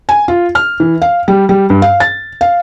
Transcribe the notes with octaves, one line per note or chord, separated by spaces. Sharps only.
G#5
F4
F6
E3
F5
G3
G3
G2
F5
A6
F5